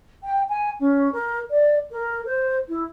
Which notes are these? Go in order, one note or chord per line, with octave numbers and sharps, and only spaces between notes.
G5
G#5
C#4
A#4
D5
A#4
C5
E4